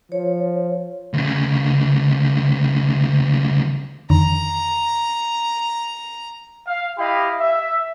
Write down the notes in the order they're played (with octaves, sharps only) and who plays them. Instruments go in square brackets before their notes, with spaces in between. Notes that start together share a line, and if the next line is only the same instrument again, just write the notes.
[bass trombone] F3 [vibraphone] C#5
[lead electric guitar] D2 C#3
[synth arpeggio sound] F2 D3 D#3 [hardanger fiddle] A#5
[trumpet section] F5
E4 G4 D#5 F5 B5
E5